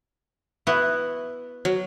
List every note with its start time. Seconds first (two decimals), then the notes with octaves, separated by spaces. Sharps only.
0.67 B3 E4 F#4
1.65 F#3